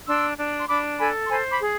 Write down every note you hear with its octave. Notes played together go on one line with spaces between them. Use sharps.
D4 C6 E6
D4
C6
D4 B5 D6
A4 G#5 B5
C6
C5 G#5 B5
B5 D6
G#4